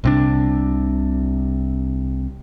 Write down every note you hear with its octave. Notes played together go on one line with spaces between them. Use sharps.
C2 C3 D4